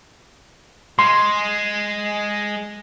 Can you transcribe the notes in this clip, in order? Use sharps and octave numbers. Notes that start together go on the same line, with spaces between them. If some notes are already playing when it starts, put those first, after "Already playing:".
G#3 C6